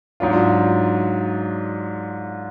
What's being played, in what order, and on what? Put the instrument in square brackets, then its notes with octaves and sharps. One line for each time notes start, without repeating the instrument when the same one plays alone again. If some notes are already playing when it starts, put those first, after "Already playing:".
[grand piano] G#2 F#3 D4 F4